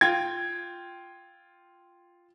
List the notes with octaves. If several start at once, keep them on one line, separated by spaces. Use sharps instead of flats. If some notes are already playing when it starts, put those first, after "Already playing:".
F4 G5 G#6